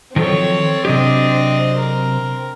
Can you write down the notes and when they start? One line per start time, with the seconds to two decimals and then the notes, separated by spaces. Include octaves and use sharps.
0.16 D#3 F3 F#3 C4 A4 C#5
0.85 C3 F#3 D4 G4 D#5
1.76 A#4